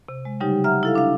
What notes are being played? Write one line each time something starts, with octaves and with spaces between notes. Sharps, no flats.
C3
G#3
C#3 F#3 G3 D#4 G4
E5 F#5 A#5 F6
E4 A4 F5
D4 F5